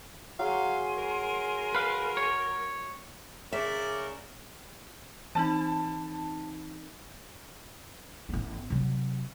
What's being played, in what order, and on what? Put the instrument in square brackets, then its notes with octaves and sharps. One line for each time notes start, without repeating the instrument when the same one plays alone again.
[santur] F#3 [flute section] G#4 C6 [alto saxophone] F5
[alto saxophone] A#4
[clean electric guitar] B4 F5
C#5
[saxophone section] C#3 [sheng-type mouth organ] A#4 [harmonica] D5 [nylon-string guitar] E5
[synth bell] E3 C4 D#4 [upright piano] A5
[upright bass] A1 B3
C3 F#3